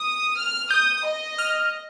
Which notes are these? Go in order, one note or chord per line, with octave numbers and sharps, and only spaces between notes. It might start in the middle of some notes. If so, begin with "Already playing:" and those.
Already playing: D#6
F6
D#6 G6
D#5
F6